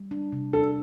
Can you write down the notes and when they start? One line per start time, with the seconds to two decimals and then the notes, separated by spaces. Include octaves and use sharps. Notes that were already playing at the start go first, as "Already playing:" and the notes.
Already playing: G3
0.11 D4
0.32 C3
0.53 D4 A4